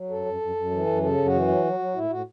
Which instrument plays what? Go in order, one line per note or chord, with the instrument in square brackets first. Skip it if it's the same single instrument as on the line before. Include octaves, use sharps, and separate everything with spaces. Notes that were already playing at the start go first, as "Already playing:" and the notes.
Already playing: [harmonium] F#3
F#2 A4
F#2
F#2
F#2
E3
F#2
C#3 A4
F#2
F#4
E3
F#3
F#3
F#3
A2 E4
A2 F#4